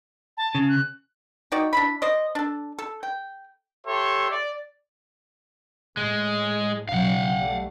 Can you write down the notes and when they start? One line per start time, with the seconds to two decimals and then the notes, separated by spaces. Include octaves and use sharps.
0.37 A5
0.55 C#3
0.69 F#6
1.52 D#4 F#4 D5 G5
1.73 D4 E4 B5
2.02 C5 D5 D#5
2.35 D4 A4
2.79 A4
3.03 G5
3.86 G4 A4 C#5 E5 C6
4.31 D5
5.97 A2 G#3
6.89 B1 C#3 F#3 F5 F#5
7.39 G3 A3